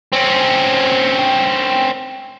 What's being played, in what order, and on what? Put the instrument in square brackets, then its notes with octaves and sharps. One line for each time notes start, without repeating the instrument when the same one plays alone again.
[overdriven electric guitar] C4 C#4